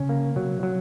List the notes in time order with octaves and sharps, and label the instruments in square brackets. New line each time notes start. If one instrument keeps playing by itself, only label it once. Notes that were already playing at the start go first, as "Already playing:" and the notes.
Already playing: [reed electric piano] C#3 [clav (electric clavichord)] C#4
[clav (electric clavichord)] A#3
[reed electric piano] C3 [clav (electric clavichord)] F#3
[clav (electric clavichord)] F#3